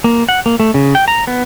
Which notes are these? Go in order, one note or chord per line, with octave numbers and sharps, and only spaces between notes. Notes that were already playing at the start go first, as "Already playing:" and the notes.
A#3
F#5
A#3
A3
C#3
G5
A#5
B3